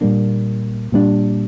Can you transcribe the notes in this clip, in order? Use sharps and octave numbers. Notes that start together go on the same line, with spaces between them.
A#2 G3 A#3 D4
A#2 G3 A#3 D4